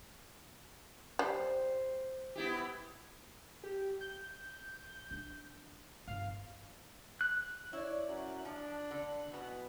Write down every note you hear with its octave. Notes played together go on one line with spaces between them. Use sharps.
G3 C5
B3 E4 G4
G4
G6
D4
G1 F5
F#6
E4 C#5 D5
F#2
F3 D4
D3
B2 E3 B3